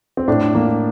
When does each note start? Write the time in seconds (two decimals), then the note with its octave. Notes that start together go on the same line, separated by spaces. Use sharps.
0.17 C4
0.28 A2 D4
0.55 A#3